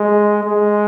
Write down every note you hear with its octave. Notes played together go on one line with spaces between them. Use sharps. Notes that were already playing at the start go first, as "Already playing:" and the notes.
Already playing: G#3
G#3